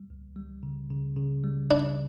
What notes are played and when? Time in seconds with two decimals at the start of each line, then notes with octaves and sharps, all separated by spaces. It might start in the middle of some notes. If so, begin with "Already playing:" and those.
Already playing: G3
0.10 C#2
0.36 G3
0.63 C#3
0.90 C#3
1.16 C#3
1.44 G3
1.71 C#3 D4